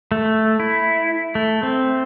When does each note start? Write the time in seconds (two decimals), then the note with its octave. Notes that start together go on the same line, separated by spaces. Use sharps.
0.12 A3
0.60 E4
1.35 A3
1.63 C4